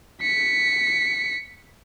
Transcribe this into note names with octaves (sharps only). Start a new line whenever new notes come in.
B6 C#7